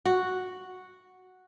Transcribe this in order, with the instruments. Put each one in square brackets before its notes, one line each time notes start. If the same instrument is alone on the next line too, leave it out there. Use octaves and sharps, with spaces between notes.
[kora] F#4